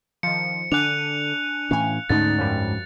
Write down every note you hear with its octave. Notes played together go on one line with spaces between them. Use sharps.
D#3 F3 C#7
D3 D4 G#5 F#6 D#7 F7
A2 E3 C#4 F5 G#5
D2 G#2 D3 A3 C#4 D#4 A6
F#2 F3 G3